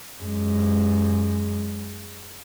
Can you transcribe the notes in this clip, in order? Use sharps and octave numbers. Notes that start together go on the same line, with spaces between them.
F#2 G#3